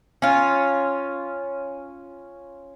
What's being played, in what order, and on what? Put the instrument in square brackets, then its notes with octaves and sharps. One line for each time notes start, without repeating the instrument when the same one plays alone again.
[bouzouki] C#4 F4